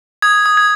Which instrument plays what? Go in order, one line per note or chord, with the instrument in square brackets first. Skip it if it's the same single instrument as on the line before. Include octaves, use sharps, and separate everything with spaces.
[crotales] D#6 G#6
D#6
G#6